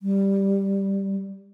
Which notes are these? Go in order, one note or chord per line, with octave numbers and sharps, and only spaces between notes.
G3